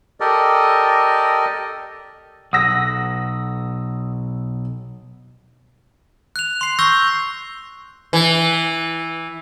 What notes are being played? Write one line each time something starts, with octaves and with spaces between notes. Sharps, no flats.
G4 A4 A#4 D5 D#5
B1 F#5 D#6 E6 A#6
F#6 F7
C6 C7
C#6 E6 G6 A#6 C7 G7
E3